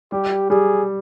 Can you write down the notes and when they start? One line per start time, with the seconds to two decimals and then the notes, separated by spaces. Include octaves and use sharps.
0.12 G3 G4
0.50 G3 G#4